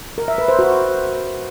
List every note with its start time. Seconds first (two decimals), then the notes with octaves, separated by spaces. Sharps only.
0.18 A#4
0.28 E5
0.38 B4
0.48 C5
0.59 F#4